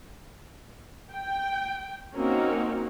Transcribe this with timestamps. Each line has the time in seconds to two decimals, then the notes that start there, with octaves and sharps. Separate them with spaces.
1.13 G5
2.16 A#3 C4 C#4 D#4 F#4 A#4